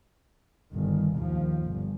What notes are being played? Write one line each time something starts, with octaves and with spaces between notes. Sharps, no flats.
G1 D#3
D#2 F3
G1